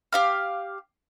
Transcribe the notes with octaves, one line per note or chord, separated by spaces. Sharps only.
G4 F5 F6